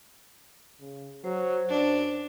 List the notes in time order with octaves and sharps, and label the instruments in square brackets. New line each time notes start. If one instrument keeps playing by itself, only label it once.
[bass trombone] C#3
[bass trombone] F#3 [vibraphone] C5
[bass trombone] F#2 [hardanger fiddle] D4